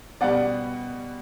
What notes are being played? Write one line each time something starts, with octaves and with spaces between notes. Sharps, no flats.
B2 G3 B3 D5 F#5